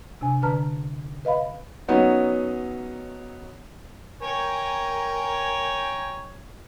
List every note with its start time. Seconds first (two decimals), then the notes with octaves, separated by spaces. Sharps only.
0.21 C3 D4 G#5
0.42 D3 D4 B4 A5 A#5 F6
1.25 B4 D#5 F5 B5
1.88 F#3 B3 C#4 D#4
4.22 A#4 C#5 G5 G#5 A#5